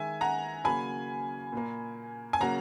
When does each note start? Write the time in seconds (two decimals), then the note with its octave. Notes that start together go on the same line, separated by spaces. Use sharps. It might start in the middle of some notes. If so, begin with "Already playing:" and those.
Already playing: D#3 G#3 E5 G#5
0.21 F#5 A#5
0.64 C#3 F#3 A#3 G#5 B5
1.52 A#2 A#3
2.33 G#5
2.40 C#3 F#3 A#3 F#5 A#5